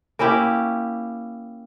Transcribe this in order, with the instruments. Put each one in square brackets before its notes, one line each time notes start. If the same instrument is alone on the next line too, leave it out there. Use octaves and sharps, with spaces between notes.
[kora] A#3 C#4 E4 G4